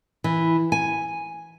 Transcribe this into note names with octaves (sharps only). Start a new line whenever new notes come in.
E3
G#5